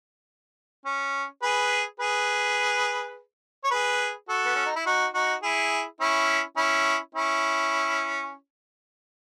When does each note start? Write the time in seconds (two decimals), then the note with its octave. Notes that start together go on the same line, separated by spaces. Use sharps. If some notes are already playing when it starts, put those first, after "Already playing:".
0.85 C#4
1.42 G#4 B4
2.00 G#4 B4
3.64 C#5
3.71 G#4 B4
4.29 F#4 A4
4.45 B3
4.55 C#4
4.66 D#4
4.76 E4
4.86 D#4 F#4
5.14 D#4 F#4
5.43 E4 G#4
6.00 C#4 E4
6.57 C#4 E4
7.14 C#4 E4